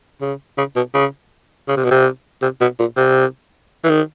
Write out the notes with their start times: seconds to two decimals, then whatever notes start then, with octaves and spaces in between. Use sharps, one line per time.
0.21 C#3
0.58 C#3
0.76 B2
0.94 C#3
1.68 C#3
1.77 C3
1.85 B2
1.91 C3
2.42 C3
2.61 B2
2.79 A#2
2.97 C3
3.84 E3
3.90 D#3